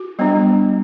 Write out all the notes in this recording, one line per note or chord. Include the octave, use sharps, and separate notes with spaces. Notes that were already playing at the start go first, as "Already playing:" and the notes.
Already playing: F#4
G3 B3 D4